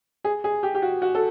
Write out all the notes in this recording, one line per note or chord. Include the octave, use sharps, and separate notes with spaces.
G#4
G#4
G4
G4
F#4
F#4
A4